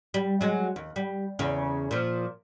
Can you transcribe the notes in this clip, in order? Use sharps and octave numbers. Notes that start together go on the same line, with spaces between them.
G3
F#3 G#3
D#2
G3
E2 C#3
A#2 F3